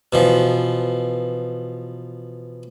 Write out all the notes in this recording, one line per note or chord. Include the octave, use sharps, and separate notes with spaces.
B2 E3 F3